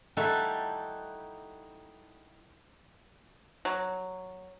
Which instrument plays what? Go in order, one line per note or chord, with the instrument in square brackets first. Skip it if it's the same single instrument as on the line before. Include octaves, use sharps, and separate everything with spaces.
[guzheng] G3 D#4 E4 F#4 A4 E5
[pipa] F#3